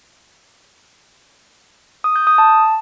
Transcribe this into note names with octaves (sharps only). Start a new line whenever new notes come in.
D#6
G6
D#6
A5